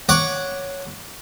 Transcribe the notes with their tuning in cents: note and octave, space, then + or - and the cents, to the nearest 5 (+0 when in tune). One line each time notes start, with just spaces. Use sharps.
C#5 +0 F#5 -10 D6 +0